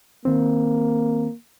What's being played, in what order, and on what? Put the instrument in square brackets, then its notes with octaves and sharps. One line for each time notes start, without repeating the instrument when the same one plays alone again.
[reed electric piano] D#3 C4 [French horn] A#3